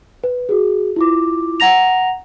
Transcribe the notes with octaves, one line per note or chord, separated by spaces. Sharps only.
B4
F#4 G#4
E4 F4 D6
F#5 A#5 A#6 F7